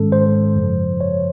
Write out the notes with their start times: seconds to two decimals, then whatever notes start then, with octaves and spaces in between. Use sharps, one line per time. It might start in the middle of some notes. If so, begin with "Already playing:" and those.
Already playing: G#2 D#3 G#3 C#4 A4
0.12 C5
0.56 F#2 C#3 F3
1.01 C#5